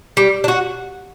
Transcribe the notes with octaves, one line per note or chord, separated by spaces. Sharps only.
G3
D4
F#4